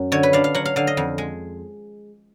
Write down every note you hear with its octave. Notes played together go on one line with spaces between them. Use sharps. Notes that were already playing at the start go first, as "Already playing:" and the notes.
Already playing: F#2
D3 C#5
B4
D4 F5
F5
F#3 F#5
F5
D3 F5
D#5
F2
G#3